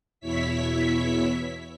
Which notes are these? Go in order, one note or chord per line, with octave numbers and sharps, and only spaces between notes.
E2 B2 E4 C#5 E5 B6